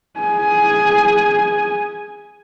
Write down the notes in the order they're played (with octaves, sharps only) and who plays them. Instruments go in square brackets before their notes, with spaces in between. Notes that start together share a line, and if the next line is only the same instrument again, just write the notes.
[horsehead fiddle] G#4 G#5